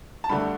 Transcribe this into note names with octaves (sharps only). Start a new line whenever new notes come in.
A5
G2 D3 A3 D4 B5